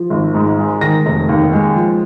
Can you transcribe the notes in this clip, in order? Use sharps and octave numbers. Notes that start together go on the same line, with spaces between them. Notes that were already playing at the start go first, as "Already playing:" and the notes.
Already playing: F3
G#1
G#2
G#3
D#3 A#6
F1
D#2
G#3
F3